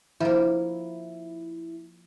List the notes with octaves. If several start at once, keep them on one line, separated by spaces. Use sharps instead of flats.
F3 A#3 E4